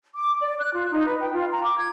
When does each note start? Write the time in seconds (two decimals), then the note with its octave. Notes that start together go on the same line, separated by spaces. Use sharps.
0.14 D6
0.40 D5
0.59 F#6
0.73 F4
0.90 D#4
1.06 B4
1.20 G5
1.32 F4
1.50 A#5
1.63 D6
1.77 G#6